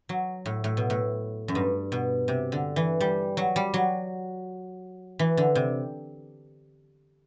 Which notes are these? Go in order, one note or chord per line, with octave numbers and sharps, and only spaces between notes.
F#3
A2
A2
B2
A2
F#2
G2
B2
C3
D3
E3
G3
F#3
G3
F#3
E3
D3
C3